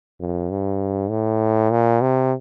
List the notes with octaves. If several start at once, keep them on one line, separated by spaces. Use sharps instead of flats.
F2
G2
A2
A#2
C3